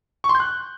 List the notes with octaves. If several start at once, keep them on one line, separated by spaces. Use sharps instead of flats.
C#6
C6
G6
F#6